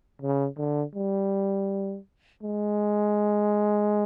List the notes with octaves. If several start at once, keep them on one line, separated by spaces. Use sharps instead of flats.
C#3
D3
G3
G#3